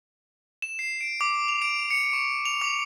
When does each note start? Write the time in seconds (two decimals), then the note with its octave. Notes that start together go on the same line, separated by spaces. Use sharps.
0.62 E7
0.79 C7
1.01 D7
1.21 D6
1.48 F7
1.62 D7
1.91 C#7
2.13 C#6
2.45 F7
2.62 D6